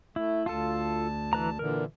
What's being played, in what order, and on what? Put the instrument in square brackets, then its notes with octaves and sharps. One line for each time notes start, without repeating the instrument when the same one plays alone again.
[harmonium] A3 [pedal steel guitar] E4
[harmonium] D2 A5 [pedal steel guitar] F4 A4
[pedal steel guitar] E3 B4 A#5
[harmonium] A#2 D3 E3 [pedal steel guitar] A#4